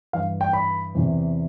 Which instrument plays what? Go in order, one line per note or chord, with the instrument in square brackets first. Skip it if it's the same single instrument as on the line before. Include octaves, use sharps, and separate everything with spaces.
[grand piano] G2 E3 F5
G5
B5
E2 C3 E3